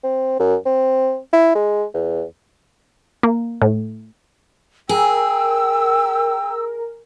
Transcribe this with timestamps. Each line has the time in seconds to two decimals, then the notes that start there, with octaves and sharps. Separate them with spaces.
0.04 C4
0.39 F#2
0.66 C4
1.33 E4
1.55 G#3
1.94 E2
3.23 A#3
3.62 A2
4.89 G#4 A#4 G5 E6